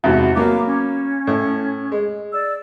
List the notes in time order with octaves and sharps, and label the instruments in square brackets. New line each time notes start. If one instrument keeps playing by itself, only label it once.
[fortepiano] E2 G#2 C3 [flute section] F#4 A5
[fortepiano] F#3 A#3 B3 [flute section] F5 A#5 D6
[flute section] C#4
[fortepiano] A2
G#3
[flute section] D5 E6